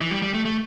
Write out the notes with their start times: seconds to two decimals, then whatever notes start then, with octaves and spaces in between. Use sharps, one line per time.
0.01 E3
0.11 G3
0.22 G3
0.34 A3
0.45 A3